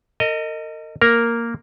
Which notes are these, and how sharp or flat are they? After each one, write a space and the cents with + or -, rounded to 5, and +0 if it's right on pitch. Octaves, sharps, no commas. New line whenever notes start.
A#4 -40 D#5 +0
A#3 -5 A#4 +0 A#5 +0